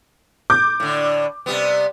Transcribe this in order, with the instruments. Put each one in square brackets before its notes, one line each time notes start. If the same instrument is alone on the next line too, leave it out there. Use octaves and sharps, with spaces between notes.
[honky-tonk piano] D6 G6
[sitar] A2 D3
C3 G3 B3